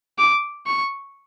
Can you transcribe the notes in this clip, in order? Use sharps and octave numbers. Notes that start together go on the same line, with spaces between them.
D6
C#6